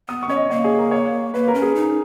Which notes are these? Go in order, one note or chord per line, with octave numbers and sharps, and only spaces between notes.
B3 D#6
C#6
C#4 C#5
D#5
A#3 C#5
G#4
A#4
C#5
A#3 B4
A#4
C#4
G#4
D#4